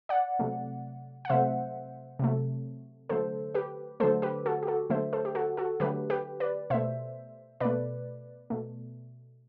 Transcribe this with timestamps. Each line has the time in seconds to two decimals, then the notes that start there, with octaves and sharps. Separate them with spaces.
0.09 D5 F#5
0.39 C3 F#3 A3
1.25 F#5
1.30 C3 F#3 A3 C5 E5
2.19 C3 F#3 A3
3.09 D3 F#3 A3 A4 C5
3.55 G4 B4
4.00 D3 F#3 A3 A4 C5
4.22 G4 B4
4.46 F#4 A4
4.63 G4
4.67 F#4 A4
4.90 D3 F#3 A3 C5 E5
5.13 A4 C5
5.25 G4
5.35 F#4 A4
5.57 F#4 A4
5.80 D3 F#3 A3 G4 B4
6.10 G4 B4
6.40 B4 D5
6.70 B2 A3 C5 E5
7.60 B2 A3 B4 D5
8.50 B2 A3